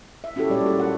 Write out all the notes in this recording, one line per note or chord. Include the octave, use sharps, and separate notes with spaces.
E5
C#4 E4 F#4 G4 A4
A#2 G3 A#3 C#4 C#5 D5
F4 F#4 A4 A#4
F#5